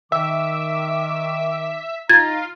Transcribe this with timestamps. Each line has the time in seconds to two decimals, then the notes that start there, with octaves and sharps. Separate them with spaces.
0.12 D#3 E5 D6 E6
2.09 D#4 F4 A#5 G#6 A6